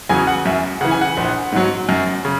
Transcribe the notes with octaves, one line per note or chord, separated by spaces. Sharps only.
E2 C#3 F#3 G#5
F#5
F#2 E5
C#3 E3 F#5
G#5
F#5
A#1
G#2 F#3
F#2
C#3